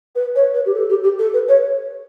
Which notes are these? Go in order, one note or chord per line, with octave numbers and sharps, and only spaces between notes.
B4
C#5
B4
G4
A4
G4
G4
A4
B4
C#5